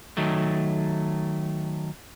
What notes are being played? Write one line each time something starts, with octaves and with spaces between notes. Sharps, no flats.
D#3 F#3 A3